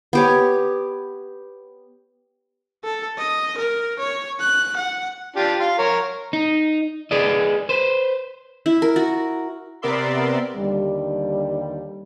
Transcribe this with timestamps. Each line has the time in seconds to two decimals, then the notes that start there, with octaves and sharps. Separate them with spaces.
0.13 B3 G4 C#5
2.84 A4
3.18 D#5
3.58 A#4
3.99 C#5
4.40 F#6
4.77 F#5
5.36 D4 F4 G4
5.60 F5 C6
5.79 A#4 C#5
6.33 D#4
7.11 G#4 B4 D5 D#5
7.69 B4 C5
8.66 E4
8.82 A#4
8.96 F#4
9.82 C3 B3 A#4 D5 E5 C6
10.57 D#2 D3 G3